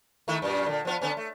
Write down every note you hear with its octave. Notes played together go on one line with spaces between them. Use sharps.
D#3 A3 E4
F#2 A#2
A#2 D3
F3 B3 F4
D3 B3 C#4
A3